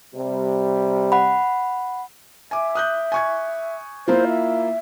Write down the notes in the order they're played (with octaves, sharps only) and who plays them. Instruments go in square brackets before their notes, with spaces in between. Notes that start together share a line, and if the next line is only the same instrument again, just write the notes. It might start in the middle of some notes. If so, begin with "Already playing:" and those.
[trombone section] C3 G3
[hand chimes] F#5 B5
[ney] E5 [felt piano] G#5 D6
[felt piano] D#6 F#6 G6
G#5 C#6 G#6
[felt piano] A#3 E4 F4 [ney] C5
[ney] E5